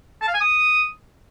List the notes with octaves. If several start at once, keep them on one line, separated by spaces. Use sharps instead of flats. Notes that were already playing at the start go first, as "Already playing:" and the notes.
A5
F5
G#5
D#6